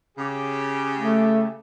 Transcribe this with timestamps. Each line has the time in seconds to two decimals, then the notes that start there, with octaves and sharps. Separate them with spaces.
0.18 C#3 G4
0.97 A3